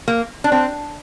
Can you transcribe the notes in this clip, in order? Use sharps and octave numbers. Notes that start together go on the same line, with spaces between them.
A#3
D4
C4